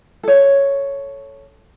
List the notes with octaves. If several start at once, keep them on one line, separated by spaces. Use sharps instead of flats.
A4 C#5